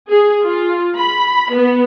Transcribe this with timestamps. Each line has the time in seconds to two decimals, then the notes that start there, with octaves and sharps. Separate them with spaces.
0.11 G#4
0.44 F4
0.97 B5
1.53 B3